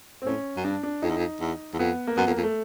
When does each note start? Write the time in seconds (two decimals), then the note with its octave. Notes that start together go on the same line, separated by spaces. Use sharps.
0.22 C4
0.25 A2 C#4
0.57 F#2
0.64 G2 D4
0.83 D4
1.02 F2 D#4
1.10 E2
1.17 F2
1.40 E2
1.74 E2
1.79 F2 B3
2.07 A#3
2.17 F#2 B3
2.27 F2
2.31 A#3
2.37 F2
2.43 A3